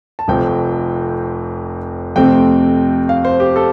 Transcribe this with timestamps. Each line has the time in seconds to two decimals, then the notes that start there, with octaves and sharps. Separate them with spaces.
0.19 A5
0.28 F1 F2 F3 C4 G5
2.16 F2 C3 A3 C4 G5
3.09 F5
3.25 C5
3.40 G4
3.56 A4